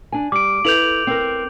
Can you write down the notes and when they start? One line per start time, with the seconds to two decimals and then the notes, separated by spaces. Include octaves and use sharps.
0.12 D4 G#5
0.32 G3 D6 D7
0.65 E4 A4 B4 G6 F7 F#7
1.07 C4 A#4